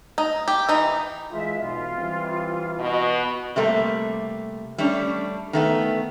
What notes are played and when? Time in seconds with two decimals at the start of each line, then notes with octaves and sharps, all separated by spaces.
0.18 D#4
0.48 G4
0.69 E3 D#4
1.32 E3 G#3 F4 E5
1.61 B1 B2 F4
1.97 E3 G3 C4
2.79 B2 D#5
3.56 C3 G3 A3 A#3
4.78 G3 A3 C#4 D4
5.53 D#3 A3 B3